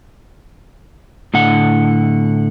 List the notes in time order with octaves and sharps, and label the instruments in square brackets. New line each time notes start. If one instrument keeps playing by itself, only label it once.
[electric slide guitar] A2 D3 F#5